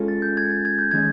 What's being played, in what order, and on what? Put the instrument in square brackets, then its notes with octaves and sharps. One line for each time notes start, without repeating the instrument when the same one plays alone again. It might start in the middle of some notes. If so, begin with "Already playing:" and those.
Already playing: [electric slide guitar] G#3 C#4 F4 A4
[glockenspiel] A6
G6
G#6
A6
G#6
G6
[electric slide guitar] D#3 G#3 C#4 [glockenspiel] G#6